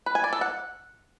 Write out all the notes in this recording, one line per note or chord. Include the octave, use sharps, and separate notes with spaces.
B4
G#5
D5
A4
F#5